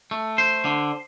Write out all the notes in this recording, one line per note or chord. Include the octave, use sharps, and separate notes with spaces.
A3
C5
D3